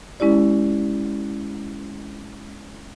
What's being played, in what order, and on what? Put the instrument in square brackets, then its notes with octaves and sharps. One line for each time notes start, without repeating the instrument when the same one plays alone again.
[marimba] G#3 C#4 E4 G4 D5